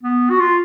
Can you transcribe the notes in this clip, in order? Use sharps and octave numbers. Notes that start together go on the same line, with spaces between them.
B3
F#4
F4